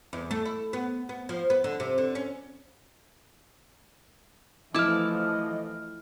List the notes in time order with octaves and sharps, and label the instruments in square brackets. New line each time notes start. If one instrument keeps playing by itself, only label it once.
[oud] E2
A3
E4
B3
B3
F3
B3
D3
C3
D3
C#4
[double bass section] E3 F3 A3 [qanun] E4 A5 [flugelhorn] D#5 [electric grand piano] D6 F6